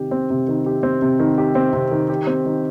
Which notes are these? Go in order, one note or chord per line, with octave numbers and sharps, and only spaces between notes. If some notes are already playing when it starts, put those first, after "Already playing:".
Already playing: C3 D#3 C4 G4
C4
C3
D#3
G4
C4
C3
D#3
G4
C4
C3
D#3
G4
C4
D#3